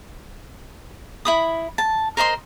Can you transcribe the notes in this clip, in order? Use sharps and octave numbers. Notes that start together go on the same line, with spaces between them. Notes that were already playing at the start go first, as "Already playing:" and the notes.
E4 B5 D#6
A5
A#4 C5 D#5 C6